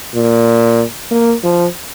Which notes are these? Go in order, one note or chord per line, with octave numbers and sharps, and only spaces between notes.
A#2
A#3
F3